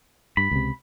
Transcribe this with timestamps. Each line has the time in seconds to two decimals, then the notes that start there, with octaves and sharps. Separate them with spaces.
0.37 G2 B5
0.51 C#2 C3